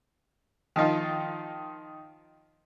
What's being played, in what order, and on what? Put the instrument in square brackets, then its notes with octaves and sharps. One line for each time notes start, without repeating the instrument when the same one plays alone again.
[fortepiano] D#3 F3 D#4 F4